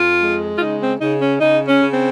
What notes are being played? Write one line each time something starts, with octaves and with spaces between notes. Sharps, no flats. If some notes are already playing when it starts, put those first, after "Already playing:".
Already playing: F2 F4
G#3
F4
C#3 D#4
C4
C#3 D#4
C#4
C#3 D#4
C#4
C#3
C4